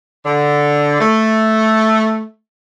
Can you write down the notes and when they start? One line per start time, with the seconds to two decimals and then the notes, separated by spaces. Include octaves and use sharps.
0.25 D3
1.00 A3